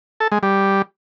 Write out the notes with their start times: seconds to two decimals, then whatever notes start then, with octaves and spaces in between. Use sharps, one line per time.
0.20 A4
0.32 G#3
0.43 G3